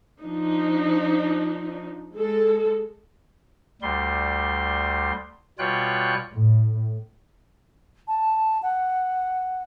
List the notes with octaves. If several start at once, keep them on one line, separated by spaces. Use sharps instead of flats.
F3 D4 D#4
G#3 A4
D2 G3 C6
B2 G3 F4 C#5 G5 F#6
A2
A5
F#5